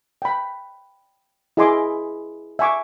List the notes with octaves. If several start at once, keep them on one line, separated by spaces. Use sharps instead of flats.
G5 B5
E4 G#4 D#5 G#5 C6 D6
E5 G#5 C#6 D6